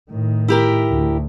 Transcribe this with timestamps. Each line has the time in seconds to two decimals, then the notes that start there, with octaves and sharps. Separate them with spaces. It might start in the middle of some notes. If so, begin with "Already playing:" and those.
0.11 A2 D#3
0.48 E4 G4 A#4
0.90 D2